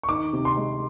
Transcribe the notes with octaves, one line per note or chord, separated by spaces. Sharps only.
C#6
D#3 D6
C3
C6
G#3